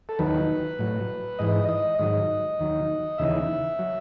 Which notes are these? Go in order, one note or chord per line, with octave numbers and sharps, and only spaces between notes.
A4
D#2 D#3 F#3 B4
A2 F#3
G#2 E3 D#5
D#5
G#2 D#3 F#3 D#5
D#2 D#3 F#3
D#2 C#3 E3 E5
F#3